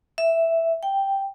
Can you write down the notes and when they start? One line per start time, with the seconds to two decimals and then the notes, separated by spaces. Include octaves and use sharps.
0.18 E5
0.83 G5